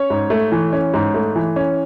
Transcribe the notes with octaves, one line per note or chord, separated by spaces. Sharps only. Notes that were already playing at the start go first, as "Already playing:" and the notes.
Already playing: C#4 C#5
G#2
A3
E3
C#4
G#2
A3
E3
C#4